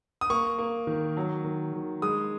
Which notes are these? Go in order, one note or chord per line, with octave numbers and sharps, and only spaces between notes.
D#6
A#3 C#6
A#3
D#3
F#3
D#3
D#3
G#3 D#6